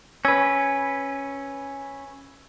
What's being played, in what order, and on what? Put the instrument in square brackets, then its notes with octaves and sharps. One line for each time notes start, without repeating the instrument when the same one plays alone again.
[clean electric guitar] C#4 B4 [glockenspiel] E6 G#6